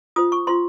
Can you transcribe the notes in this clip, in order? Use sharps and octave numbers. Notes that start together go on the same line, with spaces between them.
F4 C5 D#6
C#6
F4 C5 C6